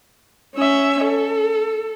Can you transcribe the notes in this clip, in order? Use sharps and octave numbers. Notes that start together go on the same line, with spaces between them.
C#4 E5
A4